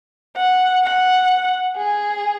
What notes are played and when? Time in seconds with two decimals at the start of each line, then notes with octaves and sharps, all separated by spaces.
0.37 F#5
0.83 F#5
1.77 G#4